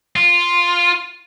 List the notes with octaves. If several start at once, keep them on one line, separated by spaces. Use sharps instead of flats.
F4